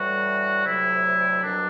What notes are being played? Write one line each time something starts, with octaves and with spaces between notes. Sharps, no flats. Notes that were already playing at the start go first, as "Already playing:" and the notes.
Already playing: A2 E3 G3 F#4
D2 C3 F#3 E4
C2 B2 F#3 D4